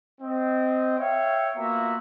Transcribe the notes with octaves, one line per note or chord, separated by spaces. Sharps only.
C4 D#5
C#5 E5 F5 G5
A#3 B3 F4 F#4 E5 A#5